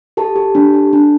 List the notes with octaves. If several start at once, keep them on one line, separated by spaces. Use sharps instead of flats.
G4 A4 A5
G4
D4
D4
D4